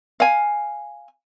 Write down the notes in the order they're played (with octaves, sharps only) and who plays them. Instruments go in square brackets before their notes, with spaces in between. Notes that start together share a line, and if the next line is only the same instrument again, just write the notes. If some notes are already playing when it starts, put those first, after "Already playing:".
[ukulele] F5 G#5